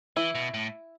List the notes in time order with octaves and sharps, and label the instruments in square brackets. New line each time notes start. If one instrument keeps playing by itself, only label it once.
[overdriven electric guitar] E3 [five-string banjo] E4
[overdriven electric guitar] B2
A2